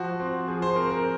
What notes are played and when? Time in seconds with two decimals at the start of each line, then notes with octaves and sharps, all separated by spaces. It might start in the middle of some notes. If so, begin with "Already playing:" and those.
Already playing: F3 F#4
0.20 C4
0.48 F3 G#4
0.62 C5
0.76 C4 A#4
0.90 A#4